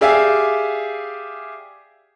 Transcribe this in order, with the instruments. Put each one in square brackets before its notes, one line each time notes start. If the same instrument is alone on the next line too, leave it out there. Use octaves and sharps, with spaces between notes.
[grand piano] G4 G#4 D5 E5 F5 G#5